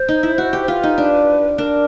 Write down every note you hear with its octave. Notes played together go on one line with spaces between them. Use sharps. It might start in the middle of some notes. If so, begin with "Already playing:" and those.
Already playing: C5
D#4
E4
F#4
G4
C5
F4 B4
D#4
D4
D4 A#4